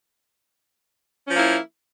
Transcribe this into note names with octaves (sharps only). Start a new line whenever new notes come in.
F3 A#3 C#4 E4